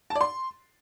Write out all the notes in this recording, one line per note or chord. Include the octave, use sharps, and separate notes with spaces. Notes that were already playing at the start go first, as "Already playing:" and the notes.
A5
D5
C6